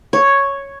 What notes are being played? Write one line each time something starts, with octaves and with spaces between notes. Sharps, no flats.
C#5